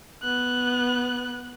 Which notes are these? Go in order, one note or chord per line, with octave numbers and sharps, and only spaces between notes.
B3 F#6